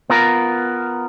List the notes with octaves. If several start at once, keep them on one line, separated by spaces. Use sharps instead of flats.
B3 F4 A#4